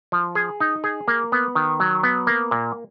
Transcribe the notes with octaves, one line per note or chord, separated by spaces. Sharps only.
F3
G#4
D#4
G#4
A#3
B3
D#3
F#3
B3
A#3
A#2